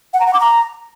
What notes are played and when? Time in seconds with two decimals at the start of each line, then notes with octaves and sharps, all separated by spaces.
0.14 F#5
0.20 A#5
0.27 F#5
0.34 D6
0.40 A#5